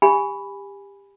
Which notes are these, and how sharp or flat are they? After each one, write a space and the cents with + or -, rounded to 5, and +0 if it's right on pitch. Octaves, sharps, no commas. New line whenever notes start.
G4 +20 G#5 +0 B5 +0